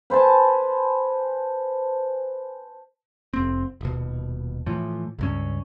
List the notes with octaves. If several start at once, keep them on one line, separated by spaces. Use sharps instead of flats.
B4 C5 G#5 A5
F1 C4
D#1 B2
A2 E3 F3
C#2 G2 C#4